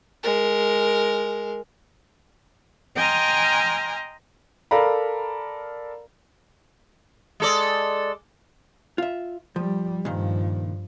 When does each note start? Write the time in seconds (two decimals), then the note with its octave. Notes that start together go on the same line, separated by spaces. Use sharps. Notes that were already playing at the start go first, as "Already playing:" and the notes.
0.23 G#3 A#4
2.95 D#5 G5 G#5 A#5 C6 F6
4.71 A4 A#4 D5 F5 A#5 B5
7.40 G#3 A4 D5
8.98 F4 E5
9.56 F3 G3
10.05 G2 A#2 D#3 F3